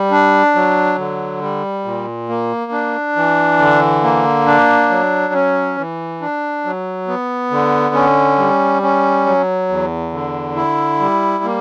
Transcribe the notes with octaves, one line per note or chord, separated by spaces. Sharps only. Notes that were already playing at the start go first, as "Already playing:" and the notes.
Already playing: G3
D4
F#3
D3
G3
A#2
A#3
D4
E3
D3
A#3
D4
F#3
C#4
E3
D4
F#3
B3
D3
C#4
G3
C#4
F#3
E2
D3
E4
G3
A#3